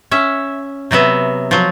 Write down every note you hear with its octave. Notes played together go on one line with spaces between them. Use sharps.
C#4 E5
C3 F#3 B3 E5
F3 F#3